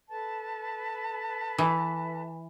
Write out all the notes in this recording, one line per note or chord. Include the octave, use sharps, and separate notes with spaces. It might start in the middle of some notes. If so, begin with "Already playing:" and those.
A4 B4 A5
E3